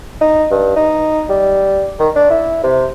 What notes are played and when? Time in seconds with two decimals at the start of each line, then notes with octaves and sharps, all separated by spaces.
0.21 D#4
0.51 G2
0.76 D#4
1.29 G3
1.99 D#3
2.16 D4
2.30 E4
2.64 C3